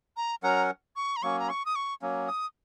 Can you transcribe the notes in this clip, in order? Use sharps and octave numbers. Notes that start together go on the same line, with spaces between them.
A#5
F#3 C#4 A#4 F#5 A#5
C#6
A#5
F#3 A#3 C#4 C#6
A#5
C#6
D#6
C#6
F#3 A#3 C#4
D#6